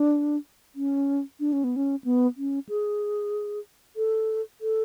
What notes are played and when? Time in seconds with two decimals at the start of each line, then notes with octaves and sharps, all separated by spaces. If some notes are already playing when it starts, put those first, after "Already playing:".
Already playing: D4
0.75 C#4
1.40 D4
1.53 C#4
1.64 B3
1.76 C#4
2.04 B3
2.37 C#4
2.69 G#4
3.96 A4
4.61 A4